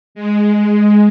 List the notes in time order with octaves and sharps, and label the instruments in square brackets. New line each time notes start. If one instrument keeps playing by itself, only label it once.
[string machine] G#3